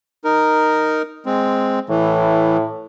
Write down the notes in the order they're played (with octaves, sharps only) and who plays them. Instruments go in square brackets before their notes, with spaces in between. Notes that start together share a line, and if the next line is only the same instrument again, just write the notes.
[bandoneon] D#4 A#4
G#3 C4
[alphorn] A2 [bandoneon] E3